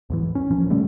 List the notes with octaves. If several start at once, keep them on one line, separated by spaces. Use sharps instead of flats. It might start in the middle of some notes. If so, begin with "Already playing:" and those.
E2 G#2 E3
C#4
D1 A#2 F3 C#4
D3 G3 A3